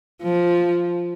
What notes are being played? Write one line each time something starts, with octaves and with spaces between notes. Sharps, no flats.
F3